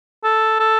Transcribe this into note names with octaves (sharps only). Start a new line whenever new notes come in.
A4
A4